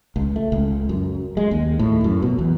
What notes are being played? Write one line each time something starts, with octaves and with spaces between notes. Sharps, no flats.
C#2
A3
C#2
F#2
G#3
D#2
A2
F#2
B2
E2